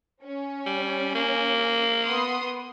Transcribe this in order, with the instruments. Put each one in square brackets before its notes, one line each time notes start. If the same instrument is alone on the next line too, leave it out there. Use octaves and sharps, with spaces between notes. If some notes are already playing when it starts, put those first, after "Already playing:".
[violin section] C#4
[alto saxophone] G3
A#3
[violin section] B3 C6 D#6